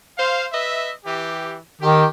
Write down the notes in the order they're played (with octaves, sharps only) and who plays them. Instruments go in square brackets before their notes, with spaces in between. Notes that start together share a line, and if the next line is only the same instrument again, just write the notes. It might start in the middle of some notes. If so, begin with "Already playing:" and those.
[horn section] C5 F5
B4 D#5 E5
E3 G4
[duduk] D#3 [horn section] G4